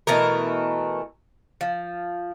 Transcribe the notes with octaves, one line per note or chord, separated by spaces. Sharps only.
B2 E3 A3 A#4
F3